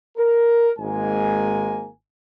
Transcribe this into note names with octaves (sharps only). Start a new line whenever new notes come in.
A#4
G#1 G#2 G#3 A#3 G#5